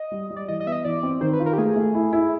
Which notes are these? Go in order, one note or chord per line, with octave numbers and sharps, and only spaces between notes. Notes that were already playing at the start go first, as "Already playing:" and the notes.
Already playing: D#5
G3
G3
D5
E3 D#5
D#5
B3 E5
D#5
E3 D5
C4
D#3 C5
B4
F4
A#4
G4
A3 G#4
A3
E4
E4